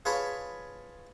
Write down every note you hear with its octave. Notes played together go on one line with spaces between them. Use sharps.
F4 G#4 B4 C#5 A5 B5